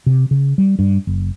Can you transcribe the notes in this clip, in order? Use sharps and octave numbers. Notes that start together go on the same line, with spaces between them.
C3
C#3
G3
G2
F#1